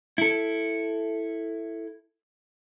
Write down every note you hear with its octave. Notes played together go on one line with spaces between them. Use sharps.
E4 A4